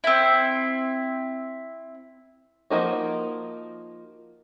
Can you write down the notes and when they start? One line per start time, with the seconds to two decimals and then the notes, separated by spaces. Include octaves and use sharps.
0.04 C4 E4
2.70 F3 A#3 D#4 F#4